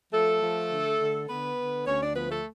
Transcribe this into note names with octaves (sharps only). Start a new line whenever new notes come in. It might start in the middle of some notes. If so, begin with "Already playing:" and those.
F3 A3 A4
F3
D3
D3
D3 B3 B4
D3
D2 C#4 C#5
D4 D5
F3 B3 B4
A3 A4